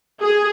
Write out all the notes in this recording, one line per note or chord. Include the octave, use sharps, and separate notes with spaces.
G#4